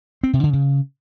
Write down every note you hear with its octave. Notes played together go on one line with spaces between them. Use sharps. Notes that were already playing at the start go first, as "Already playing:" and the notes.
C4
C3
D3
C#3